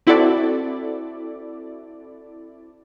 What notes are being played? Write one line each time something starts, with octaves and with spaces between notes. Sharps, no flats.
C4 E4 F#4 A4 D5